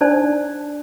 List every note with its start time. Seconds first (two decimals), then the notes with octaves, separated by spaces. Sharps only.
0.01 D4 D#4 C5 D5 A5